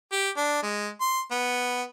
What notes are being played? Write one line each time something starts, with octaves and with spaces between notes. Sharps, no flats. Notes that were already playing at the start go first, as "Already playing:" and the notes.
G4
D4
G#3
C6
B3